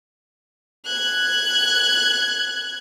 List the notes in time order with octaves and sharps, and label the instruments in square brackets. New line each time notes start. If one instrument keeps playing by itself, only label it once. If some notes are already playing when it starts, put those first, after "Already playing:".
[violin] F#6 G#6